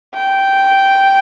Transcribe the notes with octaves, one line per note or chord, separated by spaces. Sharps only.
G5